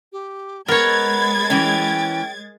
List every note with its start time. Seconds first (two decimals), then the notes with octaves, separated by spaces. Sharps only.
0.12 G4
0.68 G#3 B3 A#4 C#5 B5 G#6 A6
1.50 E3 C#4 G5